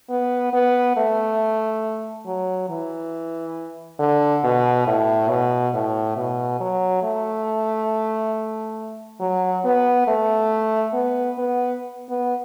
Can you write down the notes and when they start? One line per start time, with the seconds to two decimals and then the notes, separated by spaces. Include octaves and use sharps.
0.10 B3
0.53 B3
0.97 A3
2.26 F#3
2.69 E3
3.99 D3
4.44 B2
4.87 A2
5.29 B2
5.74 A2
6.17 B2
6.60 F#3
7.03 A3
9.20 F#3
9.64 B3
10.07 A3
10.94 B3
11.38 B3
12.10 B3